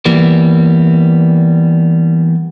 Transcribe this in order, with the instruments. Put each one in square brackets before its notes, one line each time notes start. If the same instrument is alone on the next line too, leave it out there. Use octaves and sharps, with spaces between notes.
[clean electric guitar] E3 G3 A#3 B3